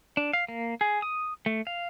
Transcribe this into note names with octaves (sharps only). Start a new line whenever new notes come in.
D4
F5
A#3
G#4
D#6
A3
F5